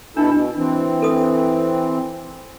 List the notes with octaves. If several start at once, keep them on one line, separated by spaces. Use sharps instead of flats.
B2 D4 E4 A4
B2 D4
E3 C4
A4 D#6